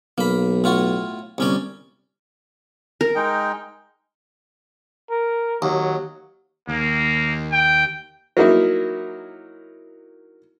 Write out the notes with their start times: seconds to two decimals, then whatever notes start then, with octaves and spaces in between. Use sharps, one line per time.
0.18 B1 A#3 B5
0.64 A2 F4 F#4
1.38 G1 C2 C#4 D5
3.01 A#4
3.15 G#3 D#4 G5
5.11 A#4
5.62 D#2 F#3
6.69 D#2 A#3
7.52 G5
8.37 F#3 A#3 D#4 E4